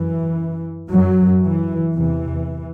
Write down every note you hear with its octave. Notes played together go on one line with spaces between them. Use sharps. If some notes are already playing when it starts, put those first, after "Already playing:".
Already playing: F#2 E3
F#2 F#3
E3
E2 C3 E3